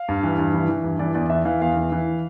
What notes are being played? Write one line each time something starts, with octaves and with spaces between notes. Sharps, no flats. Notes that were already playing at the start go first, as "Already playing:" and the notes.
Already playing: F5
G2
E3
G2
E3
E3
G2
E3 D5
E2 D5
E3 E5
E3 F5
E2 F5
E3
E3